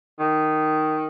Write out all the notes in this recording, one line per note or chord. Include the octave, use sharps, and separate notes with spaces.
D#3